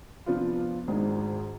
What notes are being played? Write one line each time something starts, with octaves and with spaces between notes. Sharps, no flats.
C3 F3 B3 D4 F4
G#1 G#2 G#3 D4 G#4